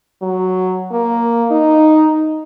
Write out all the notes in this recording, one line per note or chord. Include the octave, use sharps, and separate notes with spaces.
F#3
A#3
D#4